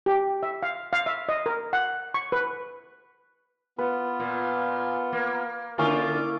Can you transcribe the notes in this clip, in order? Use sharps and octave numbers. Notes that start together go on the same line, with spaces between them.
G4
E5
F5
F5
E5
D#5
A#4
F#5
C#6
B4
B3 F4 B4
A#2
A#3
D3 A#3 C#4 E4 F4 D6